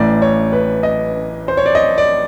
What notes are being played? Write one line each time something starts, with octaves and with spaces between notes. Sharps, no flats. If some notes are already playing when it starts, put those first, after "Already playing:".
Already playing: A1 A2 E3 D5
C#5
B4
D#5
C5
C#5
D5
D#5
D5